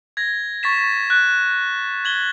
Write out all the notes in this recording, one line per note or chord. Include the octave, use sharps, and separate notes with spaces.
G#6 A#6
C#6 A6 B6 E7
F#6
G#6 F#7 G7